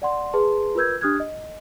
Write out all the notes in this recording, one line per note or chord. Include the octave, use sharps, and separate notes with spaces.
D5 F#5 C6
G#4 B4 A5 C6
F4 A#4 B4 E6 G6 G#6
D4 G4 D#6 F6 F#6 G#6
D#5